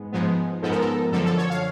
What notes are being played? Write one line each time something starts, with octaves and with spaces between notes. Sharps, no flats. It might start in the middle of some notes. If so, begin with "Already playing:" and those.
Already playing: G#2 G#3 B3
G#2 F3 G#3 B3
G#2 F3 G#3 B3 A4
A#4
A4
F#2 D3 F3 A4
A4
C#5
F5